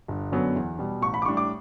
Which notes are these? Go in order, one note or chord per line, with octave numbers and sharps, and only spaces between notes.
G1
F#2 D3 F#3 B3
E2
B2 G3
A1 C#6
B5
D6
A2 G3 D4 C#6
D6